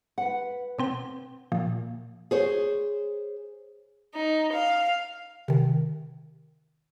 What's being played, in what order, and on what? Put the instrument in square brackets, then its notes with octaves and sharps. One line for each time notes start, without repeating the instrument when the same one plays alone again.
[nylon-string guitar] B4 F#5
[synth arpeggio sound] B2 C4 G5
[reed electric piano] A#2 [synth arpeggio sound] F3
[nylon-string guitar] G#4 C5 C#5
[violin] D#4
F5
[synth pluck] C3 D#3